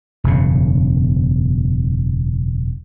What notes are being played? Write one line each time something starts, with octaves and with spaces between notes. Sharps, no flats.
E1 F#2 C#3